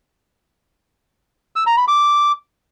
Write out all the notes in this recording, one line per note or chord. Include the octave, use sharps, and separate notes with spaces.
E6
A#5
B5
D6